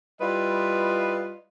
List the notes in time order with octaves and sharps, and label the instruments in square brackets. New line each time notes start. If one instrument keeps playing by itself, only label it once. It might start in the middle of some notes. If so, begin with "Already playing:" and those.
[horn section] G3 E4 F4 B4 D#5